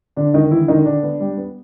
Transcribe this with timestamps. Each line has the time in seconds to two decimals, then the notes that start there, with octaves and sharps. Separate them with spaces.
0.17 D3 D4
0.34 D3 D#3 D#4
0.51 D3 E3 E4
0.68 D3 D#3 D#4
0.85 D3 D4
1.03 B3
1.20 G3
1.37 B3